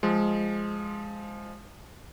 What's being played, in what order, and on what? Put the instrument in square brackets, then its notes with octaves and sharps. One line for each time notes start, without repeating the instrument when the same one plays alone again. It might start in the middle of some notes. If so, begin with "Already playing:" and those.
[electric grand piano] F3 G#3